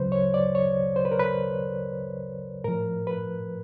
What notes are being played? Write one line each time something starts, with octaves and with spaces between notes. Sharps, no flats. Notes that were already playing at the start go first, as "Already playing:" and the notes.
Already playing: D2 C#3 F#3 B4 C5
C#5
D5
C#5
C5
B4
A#4
B4
A2 F3 A#4
B4